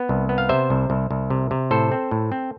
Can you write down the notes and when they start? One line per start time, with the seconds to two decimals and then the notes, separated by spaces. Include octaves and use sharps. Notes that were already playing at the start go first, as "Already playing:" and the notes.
Already playing: B3
0.09 C2
0.29 B3
0.38 F5
0.49 C3 C5 E5
0.70 C2
0.90 C2
1.11 C2
1.30 C3
1.51 C3
1.71 A2 A4 C5
1.92 C4
2.11 A2
2.32 C4